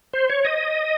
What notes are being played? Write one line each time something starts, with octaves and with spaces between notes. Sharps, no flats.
C5
C#5
D#5